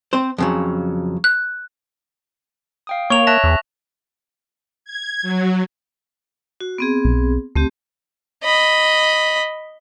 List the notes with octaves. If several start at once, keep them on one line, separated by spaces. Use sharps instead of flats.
C4 C5
F2 C#3 F#3
F#6
F5 G5 D#6
A#3 C#5 C#6 F7
E5 A5 F#6 A#6
E2
G#6
F#3
F#4
B3 C4 G#4
B1
D2 A3 C4 G4
D#5 B5